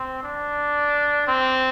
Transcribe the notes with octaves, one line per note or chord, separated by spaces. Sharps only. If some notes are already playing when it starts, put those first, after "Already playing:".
Already playing: C4
D4
C4